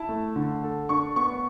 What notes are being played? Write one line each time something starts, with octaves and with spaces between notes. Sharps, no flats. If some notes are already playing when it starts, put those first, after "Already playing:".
Already playing: E4 A5
A3
D3
A4
D4 C#6
B3 C#6